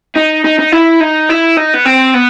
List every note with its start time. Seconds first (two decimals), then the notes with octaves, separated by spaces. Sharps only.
0.16 D#4
0.45 D#4
0.59 D#4
0.72 E4
1.01 D#4
1.30 E4
1.57 D#4
1.74 B3
1.85 C4
2.14 B3